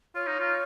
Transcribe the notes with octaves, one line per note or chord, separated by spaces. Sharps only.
F4 C#5
D#4
F4